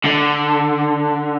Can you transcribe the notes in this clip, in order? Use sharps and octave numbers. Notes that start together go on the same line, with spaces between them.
D3